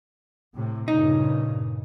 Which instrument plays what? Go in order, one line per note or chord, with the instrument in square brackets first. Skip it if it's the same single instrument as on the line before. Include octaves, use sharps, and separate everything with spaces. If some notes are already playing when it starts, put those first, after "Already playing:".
[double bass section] A2 C3
[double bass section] G2 A#2 C#3 [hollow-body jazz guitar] D#4